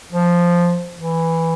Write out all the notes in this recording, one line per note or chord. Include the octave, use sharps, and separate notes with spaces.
F3
E3